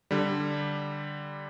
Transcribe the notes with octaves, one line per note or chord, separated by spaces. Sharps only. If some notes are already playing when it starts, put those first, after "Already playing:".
D3 G3